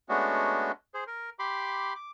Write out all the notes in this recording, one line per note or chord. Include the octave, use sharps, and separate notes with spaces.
G#3 A3 B3 C#4 D4 F#4
G#4 C5
A#4
G4 B5 C6 D6
D6